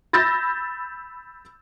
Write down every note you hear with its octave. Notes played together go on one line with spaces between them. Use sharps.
B5 E6 G6 A6 A#6